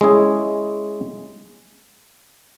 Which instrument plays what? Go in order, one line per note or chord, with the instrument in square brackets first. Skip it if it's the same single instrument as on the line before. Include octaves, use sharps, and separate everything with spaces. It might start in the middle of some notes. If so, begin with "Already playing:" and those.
[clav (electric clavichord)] G#3 C#4 E4 G#4